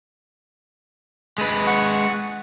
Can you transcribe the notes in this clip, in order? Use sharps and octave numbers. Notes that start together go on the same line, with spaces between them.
G#3 B4
F#5 C#6